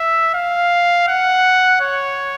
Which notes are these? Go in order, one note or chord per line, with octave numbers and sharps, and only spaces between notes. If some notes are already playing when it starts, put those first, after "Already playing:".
Already playing: E5
F5
F#5
C#5